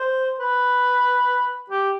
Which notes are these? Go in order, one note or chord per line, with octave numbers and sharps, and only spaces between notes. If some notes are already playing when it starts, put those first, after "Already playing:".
Already playing: C5
B4
G4